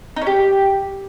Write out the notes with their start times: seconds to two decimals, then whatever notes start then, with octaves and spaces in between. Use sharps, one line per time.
0.16 D#4
0.22 C#4
0.27 G4